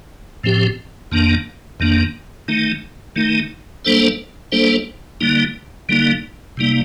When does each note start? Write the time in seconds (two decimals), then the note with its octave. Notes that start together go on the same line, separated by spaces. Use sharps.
0.44 A2 F3 C4 G4
1.12 F2 D#3 A#3 D4
1.80 F2 D#3 A#3 D4
2.48 D#3 A3 D#4
3.16 D#3 A3 D#4
3.85 G3 A#3 D4 A4 C5
4.52 G3 A#3 D4 A4 C5
5.21 D3 G3 A#3 D#4
5.89 D3 G3 A#3 D#4
6.57 C3 G3 A#3 D#4